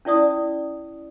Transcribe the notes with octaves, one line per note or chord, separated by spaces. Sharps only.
C#4 E4 D5 D#6